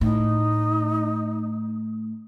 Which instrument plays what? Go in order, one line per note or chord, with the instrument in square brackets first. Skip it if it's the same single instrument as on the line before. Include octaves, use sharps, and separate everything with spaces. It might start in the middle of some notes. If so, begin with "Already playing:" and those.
[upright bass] A2 [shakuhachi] D#4